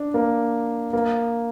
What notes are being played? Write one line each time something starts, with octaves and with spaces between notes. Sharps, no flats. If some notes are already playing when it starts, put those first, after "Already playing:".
Already playing: D4
A#3
A#3